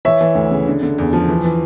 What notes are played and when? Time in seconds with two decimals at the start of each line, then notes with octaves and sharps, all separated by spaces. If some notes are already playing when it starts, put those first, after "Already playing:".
0.05 E3 C#5 E5
0.21 E3
0.35 D2
0.51 C#3
0.67 D3
0.83 D3
0.98 E2
1.13 F3
1.29 E3
1.44 E3